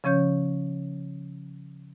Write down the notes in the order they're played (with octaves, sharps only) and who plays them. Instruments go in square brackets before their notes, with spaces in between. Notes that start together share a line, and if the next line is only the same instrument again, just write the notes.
[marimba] C#3 F3 C#4 C#5 G6